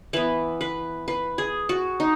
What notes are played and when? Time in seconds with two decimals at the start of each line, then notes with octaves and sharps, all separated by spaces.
0.13 E3 B3 B4
0.61 B4
1.08 B4
1.38 G#4
1.69 F#4
2.00 D#4